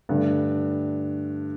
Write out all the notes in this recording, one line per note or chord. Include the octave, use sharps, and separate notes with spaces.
G2 D3 A3